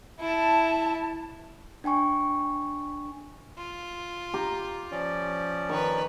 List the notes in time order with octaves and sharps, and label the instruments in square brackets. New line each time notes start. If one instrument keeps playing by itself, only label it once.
[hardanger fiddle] E4 [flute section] A5
[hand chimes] D4 G5 G#5 C#6
[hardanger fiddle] F4
[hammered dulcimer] G4 A#5
[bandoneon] F3 C#4 D5
[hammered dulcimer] D#3 [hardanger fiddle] B4 C#5